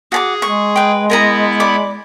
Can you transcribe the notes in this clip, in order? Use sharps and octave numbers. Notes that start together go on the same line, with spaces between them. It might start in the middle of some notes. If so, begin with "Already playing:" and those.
F#4 G#4 A5 D6
G#3 C#6
B4 G5
B3 E4 A#4 D#5 A#5
D5 B5 D6